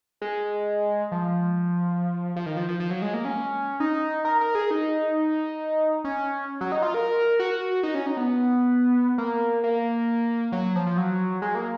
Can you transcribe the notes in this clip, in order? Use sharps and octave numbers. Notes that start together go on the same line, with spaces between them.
G#3
F3
F3
D#3
F3
F3
F3
F#3
G#3
A#3
C#4
D#4
A#4
A#4
G#4
D#4
C#4
F#3
D#4
F4
A#4
F#4
D#4
C#4
D#4
B3
A#3
A#3
F#3
F3
F3
F#3
G#3
A#3